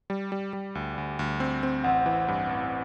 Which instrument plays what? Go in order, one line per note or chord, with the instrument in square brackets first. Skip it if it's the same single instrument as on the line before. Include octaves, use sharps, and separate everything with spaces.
[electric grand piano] G3
G3
G3
D2
D2
D2
C4
C4
[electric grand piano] A1 [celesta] F#5
[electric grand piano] E3
G2
A1